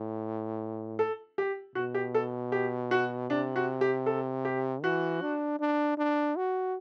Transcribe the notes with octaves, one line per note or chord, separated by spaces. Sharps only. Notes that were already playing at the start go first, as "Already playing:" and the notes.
Already playing: A2
A4
G4
B2 F#4
G4
A4
G4
F#4
C3 D4
F#4
G4
A4
G4
E3 F#4
D4
D4
D4
F#4